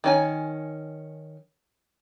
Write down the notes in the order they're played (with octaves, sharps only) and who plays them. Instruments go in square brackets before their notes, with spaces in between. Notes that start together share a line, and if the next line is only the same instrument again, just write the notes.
[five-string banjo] D#3 C#4 G#5